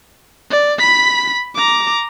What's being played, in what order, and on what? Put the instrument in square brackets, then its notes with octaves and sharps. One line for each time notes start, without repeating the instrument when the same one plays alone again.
[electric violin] D5
B5 B6
A#5 D6